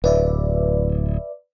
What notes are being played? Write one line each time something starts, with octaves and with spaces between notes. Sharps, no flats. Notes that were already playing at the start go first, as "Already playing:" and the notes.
D1 B4 D5 E5